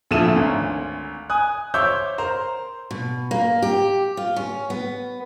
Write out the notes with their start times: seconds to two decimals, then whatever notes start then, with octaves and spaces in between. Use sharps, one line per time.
0.11 D2 A#2 F3 A3 E4 E7
0.36 G#1 D2 C#4
1.30 G#5 D#6 F#6
1.74 C5 C#5 E5 D6 E6 G6
2.18 A#4 C5 A#5
2.91 B2
3.31 A#3
3.62 G4
4.17 F4
4.36 C#4
4.70 B3